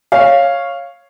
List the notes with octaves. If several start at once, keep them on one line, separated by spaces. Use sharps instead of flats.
C#5 F5